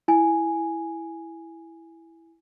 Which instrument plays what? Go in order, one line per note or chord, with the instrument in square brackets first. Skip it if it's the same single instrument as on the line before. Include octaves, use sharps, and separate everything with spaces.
[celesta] E4 G#5